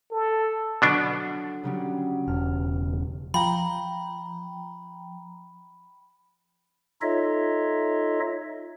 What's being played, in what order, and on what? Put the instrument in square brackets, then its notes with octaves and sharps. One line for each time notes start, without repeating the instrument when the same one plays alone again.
[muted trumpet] A4
[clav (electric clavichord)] B2 B3 D4 [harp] D3 F#3 A4
[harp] C#3 F#3 G3
[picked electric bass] E1 [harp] F6
[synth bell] F3 G5 A#5 [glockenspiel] B5
[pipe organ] D#4 F4 A4 C#5 D#5 E5